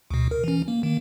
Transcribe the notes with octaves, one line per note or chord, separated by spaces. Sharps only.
D2 B2
A#4
E3 C#4
A#3
D#3 A#3